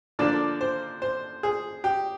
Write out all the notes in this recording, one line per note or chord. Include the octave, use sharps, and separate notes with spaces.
D3 F3 A#3 D4 D5
C5
C5
G#4
G4